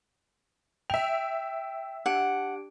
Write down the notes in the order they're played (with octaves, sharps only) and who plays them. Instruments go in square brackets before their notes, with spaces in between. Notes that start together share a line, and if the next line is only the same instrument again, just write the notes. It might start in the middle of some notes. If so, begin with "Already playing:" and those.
[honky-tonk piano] E5 F7 [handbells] G5
[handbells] D4 G4 D7 [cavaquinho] F#5